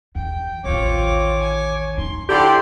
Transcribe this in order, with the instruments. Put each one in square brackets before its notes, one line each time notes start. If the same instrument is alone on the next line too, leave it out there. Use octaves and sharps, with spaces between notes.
[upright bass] E2 [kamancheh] G5
[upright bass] A1 D#2 [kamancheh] C4 F4 [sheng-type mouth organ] C#5 D6
[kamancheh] G#5
[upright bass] B3 D#4 [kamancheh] C6
[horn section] D3 G4 [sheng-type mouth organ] E4 D5 B5 [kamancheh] C5 C6